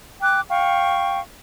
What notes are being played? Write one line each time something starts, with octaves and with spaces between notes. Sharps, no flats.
G5 D6 F#6
F5 G5 C#6